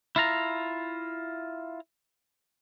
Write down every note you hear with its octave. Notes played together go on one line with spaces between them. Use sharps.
E4 F4 A#5